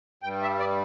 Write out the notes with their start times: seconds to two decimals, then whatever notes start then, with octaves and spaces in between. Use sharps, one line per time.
0.23 G2 G3 G5
0.42 E5
0.60 D5